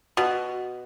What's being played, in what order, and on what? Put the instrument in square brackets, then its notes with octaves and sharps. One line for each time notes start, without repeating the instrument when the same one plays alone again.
[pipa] B2 [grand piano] F#4